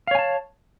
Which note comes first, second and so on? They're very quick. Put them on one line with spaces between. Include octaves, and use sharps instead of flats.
F5 C#5 G#5 A5